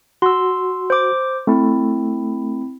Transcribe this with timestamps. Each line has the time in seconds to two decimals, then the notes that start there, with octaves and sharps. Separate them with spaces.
0.22 F#4 C6 E6
0.90 C5 D6
1.47 A3 C4 E4